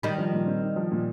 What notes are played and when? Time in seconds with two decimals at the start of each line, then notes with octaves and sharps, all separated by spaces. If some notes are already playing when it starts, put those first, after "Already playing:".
0.03 D#3 G3 D#4
0.18 F3
0.33 A#2
0.47 C4
0.63 D#4
0.76 F3
0.92 A#2